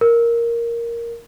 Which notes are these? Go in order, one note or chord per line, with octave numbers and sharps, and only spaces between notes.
A#4